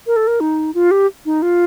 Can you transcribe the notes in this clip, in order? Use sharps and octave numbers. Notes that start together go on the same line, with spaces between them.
A#4
A4
A#4
D#4
F4
G4
D#4
F4